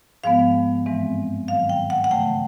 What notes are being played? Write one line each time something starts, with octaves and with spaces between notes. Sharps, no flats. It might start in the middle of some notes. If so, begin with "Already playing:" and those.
G#2 F3 G#3 B3 F5
G2 E3 G#3 C4
G#2 D#3 F#3 F5
G5
F#5
F#5
C#3 E3 A3 G5